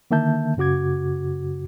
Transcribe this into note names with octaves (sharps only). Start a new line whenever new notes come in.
D3 D#3 A#3 E5 A5 G6
F#2 C#3 F#4 D6 G#6